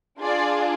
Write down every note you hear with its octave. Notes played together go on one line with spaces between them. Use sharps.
D4 F4 G#4 D5